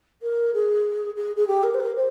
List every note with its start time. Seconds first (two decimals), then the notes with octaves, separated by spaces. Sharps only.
0.22 A#4
0.53 G#4
1.16 G#4
1.36 G#4
1.47 G4
1.63 A#4
1.74 C5
1.79 A#4
1.95 C5